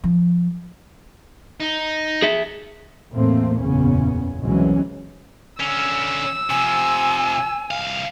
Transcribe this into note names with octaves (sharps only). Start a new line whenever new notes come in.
F3
D#4
G#4 E5
E2 A2 A3 A#3 C4
F#1 E2 A#2 C#3 B3 C#4
C2 B2 E3 F#3 G#3 C#4
D3 C#4 E6
C3 F3 G#5
C2 F5